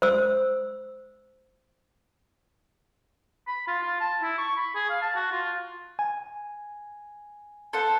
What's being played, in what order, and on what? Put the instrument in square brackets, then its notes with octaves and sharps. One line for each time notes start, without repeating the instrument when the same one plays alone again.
[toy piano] C5 E6
[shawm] B5
F4
F4
A5
E4
C#6
B5
G#4
F5
A5
F#4
F4
[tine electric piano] G#5
[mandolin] A4 C5 F#5